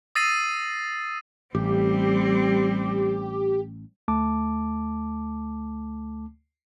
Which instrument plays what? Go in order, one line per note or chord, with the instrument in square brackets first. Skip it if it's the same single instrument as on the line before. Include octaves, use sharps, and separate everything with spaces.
[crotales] D#6 E6 A6 A#6 C7 D#7
[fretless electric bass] A1 [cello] G3 C4 [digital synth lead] G4
[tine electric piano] D2 A3 A5 D6